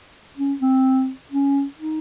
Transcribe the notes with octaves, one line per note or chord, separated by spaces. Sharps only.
C#4
C4
C#4
D#4